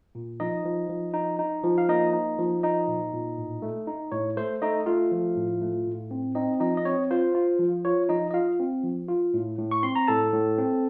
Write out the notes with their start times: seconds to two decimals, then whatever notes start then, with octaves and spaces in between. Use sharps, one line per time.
0.15 A#2
0.40 F3 D#4 D#5
0.65 F3
0.89 F3
1.14 D#4
1.39 D#4
1.64 F3
1.78 F5
1.89 A#3 D#4 D#5
2.13 D#4
2.38 F3
2.63 D#4 D#5
2.88 A#2
3.14 A#2
3.38 A2
3.62 A3
3.87 D#4
4.12 A2 C#5
4.37 A3 C5
4.62 A3 D#4 D#5
4.86 A3 F4 F5
5.12 F3
5.36 A2
5.62 A3
5.86 A2
6.11 C4
6.35 C4 D#4 D#5
6.60 F3 D#4 D#5
6.77 D#5
6.85 C4 C#5
7.11 F4 C5
7.35 F4
7.59 F3
7.85 F4 C#5
8.09 F3 D#4 D#5
8.31 D#5
8.34 F4 F5
8.59 C4
8.84 F3
9.09 F4
9.34 A2
9.59 A2
9.71 C#6
9.83 C4 C6
9.95 A#5
10.08 A2 A4 A5
10.33 A2
10.58 C4